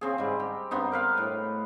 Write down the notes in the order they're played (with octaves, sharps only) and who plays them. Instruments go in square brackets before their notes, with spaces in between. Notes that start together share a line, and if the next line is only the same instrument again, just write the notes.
[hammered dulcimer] C#3 C4 G#4
G#2 G3
G4
G2 B3 C4 D#4
A#4 B4 F5
A2